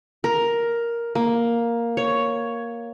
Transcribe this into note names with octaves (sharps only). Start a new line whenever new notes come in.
A#4
A#3
C#5